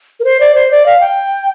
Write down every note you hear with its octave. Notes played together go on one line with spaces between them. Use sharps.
A#4
C5
D5
C5
D5
F5
G5